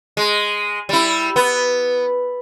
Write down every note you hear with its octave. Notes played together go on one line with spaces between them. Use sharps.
G#3
G3 E4
B3